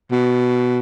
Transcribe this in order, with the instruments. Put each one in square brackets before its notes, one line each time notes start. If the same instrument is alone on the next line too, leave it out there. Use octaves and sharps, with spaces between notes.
[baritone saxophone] B2